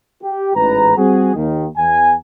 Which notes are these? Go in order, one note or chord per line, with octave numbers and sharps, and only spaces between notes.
G4
A1 G#2 B4 A#5
G3 C4 F#4 G#4
D#2 D#3
E2 G#5